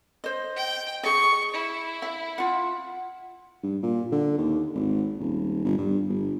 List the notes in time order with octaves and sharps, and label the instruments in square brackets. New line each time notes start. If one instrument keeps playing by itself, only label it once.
[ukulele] C5 D#5
[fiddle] G5
[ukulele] G#4 D#5 [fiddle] C#6
[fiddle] E4
[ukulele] E5
F4 F#5
[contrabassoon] G2
A#2
D3
D#2
G#1
D#1
G1
G2
G1